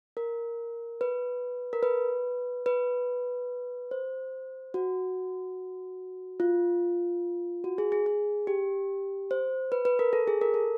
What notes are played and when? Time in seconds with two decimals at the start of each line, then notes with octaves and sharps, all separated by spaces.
0.17 A#4
1.01 B4
1.73 A#4
1.83 B4
2.66 B4
3.91 C5
4.74 F#4
6.40 F4
7.64 F#4
7.78 G#4
7.92 G#4
8.06 G#4
8.47 G4
9.31 C5
9.72 B4
9.85 B4
9.99 A#4
10.13 A4
10.28 G#4
10.41 A#4
10.54 A4